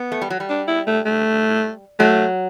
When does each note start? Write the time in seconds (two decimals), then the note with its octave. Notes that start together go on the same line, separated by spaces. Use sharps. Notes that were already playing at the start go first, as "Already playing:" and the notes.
Already playing: B3
0.12 A3
0.22 G3
0.30 F#3
0.40 G3
0.50 D4
0.68 E4
0.87 A3
1.05 A3
2.00 F#3 A3